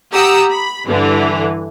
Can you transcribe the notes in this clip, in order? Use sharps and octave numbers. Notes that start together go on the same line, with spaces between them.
G4 F#5 A#5 D#6 E6
B5
G2 D3 E3